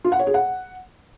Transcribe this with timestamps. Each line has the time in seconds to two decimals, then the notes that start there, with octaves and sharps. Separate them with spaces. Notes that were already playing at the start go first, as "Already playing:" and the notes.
0.04 F4
0.12 F#5
0.19 C#5
0.27 G#4
0.34 F#5